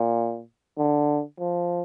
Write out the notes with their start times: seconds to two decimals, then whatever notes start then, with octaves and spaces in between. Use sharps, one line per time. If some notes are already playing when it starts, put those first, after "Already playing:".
Already playing: A#2
0.78 D3
1.40 F3